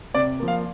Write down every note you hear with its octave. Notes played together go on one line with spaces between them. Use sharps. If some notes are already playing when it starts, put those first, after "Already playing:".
C3 D5
F3 A#3
F5